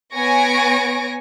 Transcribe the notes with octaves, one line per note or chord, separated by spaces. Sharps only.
B3 C#5 G#5 C#6 A#6 D7